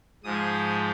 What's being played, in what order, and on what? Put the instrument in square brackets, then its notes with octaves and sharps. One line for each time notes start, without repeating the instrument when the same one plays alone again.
[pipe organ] G#2 F3 G#3 D#6